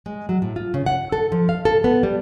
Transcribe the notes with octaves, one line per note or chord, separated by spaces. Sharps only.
G#3
F#3
A2
F4
C#3
F#5
A4
F3
F5
A4
B3
G3